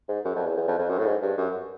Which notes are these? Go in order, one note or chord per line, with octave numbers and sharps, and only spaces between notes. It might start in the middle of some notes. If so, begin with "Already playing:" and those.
G#2
F#2
F2
E2
E2
F2
F2
F#2
A2
G#2
G2
F#2